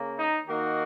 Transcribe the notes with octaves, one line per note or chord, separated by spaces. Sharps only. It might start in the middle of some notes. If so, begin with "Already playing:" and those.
Already playing: C#3 A#3
D#4
D#3 A#3 D#4 F#4